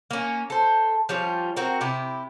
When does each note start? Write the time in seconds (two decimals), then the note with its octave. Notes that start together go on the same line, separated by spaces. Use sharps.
0.11 A#3 C#4
0.50 A4 C5
1.09 F3 G3 C#4 F4
1.56 C4 F#4 A#4
1.81 C3 E4 G4